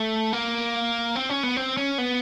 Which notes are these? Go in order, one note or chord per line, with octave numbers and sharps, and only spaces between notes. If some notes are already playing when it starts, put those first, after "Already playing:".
Already playing: A3
A#3
C4
C#4
B3
C4
C#4
B3